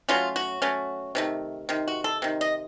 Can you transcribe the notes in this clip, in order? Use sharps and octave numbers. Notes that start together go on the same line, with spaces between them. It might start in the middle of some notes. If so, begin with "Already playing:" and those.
F#3 A3 C#4 F4
F#4
F#3 A3 C#4
C3 D#3 A3
C3 D#3
F#4
A4
C3 D#3
D#5